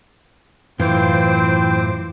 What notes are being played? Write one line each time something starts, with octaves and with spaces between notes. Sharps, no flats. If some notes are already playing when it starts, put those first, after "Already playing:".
F#2 A2 E3 C4 F4 C5 D6